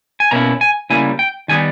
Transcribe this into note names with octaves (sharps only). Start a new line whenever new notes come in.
G#5
B2 A#3 C#4 E4 A#5
G#5
C#3 G3 A#3 E4 G#5
G5
D#3 G3 B3 D#4 G#5